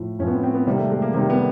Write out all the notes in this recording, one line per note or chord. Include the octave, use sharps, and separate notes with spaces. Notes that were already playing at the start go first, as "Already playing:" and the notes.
Already playing: A2 F3
A2 F3 C#4
B3
C4
C4
B3
C3 D#3 G3 A#3
A3
G#3
A#3
C3 D#3 G3 A#3
B3